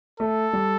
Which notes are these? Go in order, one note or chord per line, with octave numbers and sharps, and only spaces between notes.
A3 A4
G3